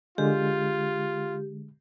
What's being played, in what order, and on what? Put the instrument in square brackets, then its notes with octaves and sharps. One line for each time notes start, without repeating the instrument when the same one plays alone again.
[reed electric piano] D3 G#3 [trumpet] F4 [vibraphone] G4